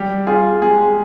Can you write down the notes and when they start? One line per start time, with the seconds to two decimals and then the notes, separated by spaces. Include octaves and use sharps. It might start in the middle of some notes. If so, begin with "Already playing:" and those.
Already playing: G3 G4
0.27 F4 G#4
0.62 G#3 G#4